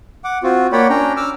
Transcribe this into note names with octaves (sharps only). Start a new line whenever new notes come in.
F#5 D6
C4 F4 F#4
A#3 C#5 D5 F#5 G5 B5
C#4 D4 G5 A#5
D6 E6 F6